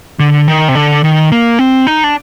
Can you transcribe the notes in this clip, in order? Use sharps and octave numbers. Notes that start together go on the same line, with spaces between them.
D3
D#3
C3
D3
D#3
A#3
C4
D#4
D4